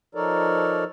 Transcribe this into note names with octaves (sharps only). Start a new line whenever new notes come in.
F3 D#4 A4 A#4 C#5 D5